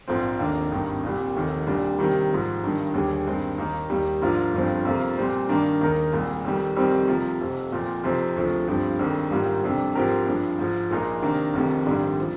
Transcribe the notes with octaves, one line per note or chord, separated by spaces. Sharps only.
A#1 G#2 F3 C4
F1 D#2 D#3 A#3 D4
G#1 G2 D#3
C2 A#2 G3
F1 D#2 D#3
C2 A#2 G3 D4
C3 D#3 G3 A#3
G#2 F3 G#3
G1 G2 D#3
D#2 D3 G3 D4 G#4
G2 D#3 G#3 C4
D#2 D#3 A#3 D#4
D#2 D#3 G3
G#2 F3 A#3 D4 F4
G1 G2 F3 C4
F2 C3 F3 A#3 F4
A#2 G3 C4
G2 D#3 A#3 D4
D#2 D#3 G#3 D#4 A#4
C2 A#2 G#3
F2 D#3 G3
F1 F2 D#3 G3 C4
C3 F3 A#3
F1 F2 C3
A#2 F3 C4
F2 C3 F3 C4 D#4
D2 C3 F3 G#3
G1 G2 F3 C4 G4
F2 D#3 G#3 D4
G#2 D#3 G3 A#3 F4
F2 C3 G3 D4
G#2 F3 C4 G4 A#4
G2 F3 G#3 D4
G#2 F3 G#3
A#1 A#2 G#3 D#4 A#4
C3 D#3 A#3 D4
F1 F2 C3 D#3 G#3
A#1 G#2 D#3 G3 D4
F3